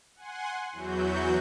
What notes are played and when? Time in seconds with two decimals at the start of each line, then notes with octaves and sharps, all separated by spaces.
0.15 F#5 G#5 C6
0.72 E2 E3 F#3 F#4 G6